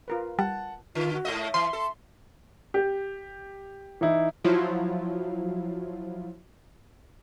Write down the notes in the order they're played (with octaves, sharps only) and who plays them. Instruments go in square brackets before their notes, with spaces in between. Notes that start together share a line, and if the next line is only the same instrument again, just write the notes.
[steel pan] F4 A#4 B4
[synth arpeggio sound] G3 [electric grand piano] F#5 A5
[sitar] D3 [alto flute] F4
[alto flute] F#4
[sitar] G#2 A3 D#5
[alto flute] E5
[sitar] E3 [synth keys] C6
[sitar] A4
[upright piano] G4
[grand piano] E3 D#4 E4
[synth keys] F3 F#3 E4 F4